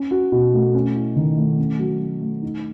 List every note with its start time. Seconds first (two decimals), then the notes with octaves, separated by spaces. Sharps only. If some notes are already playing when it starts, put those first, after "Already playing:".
Already playing: C#4
0.11 F#4
0.32 B2
0.54 A3
0.75 C#4
0.95 E4
1.16 D#3
1.37 A3
1.58 C#4
1.79 F#3
2.00 F#3
2.21 A3
2.42 D#4